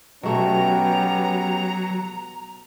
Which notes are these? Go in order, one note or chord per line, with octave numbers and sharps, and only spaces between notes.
B2 F#3 A3 B3 C#4 G4 A#5